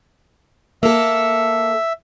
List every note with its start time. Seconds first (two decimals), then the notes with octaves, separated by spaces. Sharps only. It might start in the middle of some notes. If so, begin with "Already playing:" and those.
0.83 A#3 A4 E5